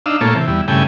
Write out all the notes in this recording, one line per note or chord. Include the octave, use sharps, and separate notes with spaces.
D4 D#4 F5 E6
A#2 A3 A#3 F4 A4 C#5
C3 E3
E2 G3 E4
G2 C#3 A3 E4 G5 G#5